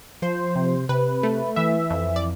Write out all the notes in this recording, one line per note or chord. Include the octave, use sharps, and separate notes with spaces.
F3 C5
C3
C3 B4
A3
E3 E5
F2
D5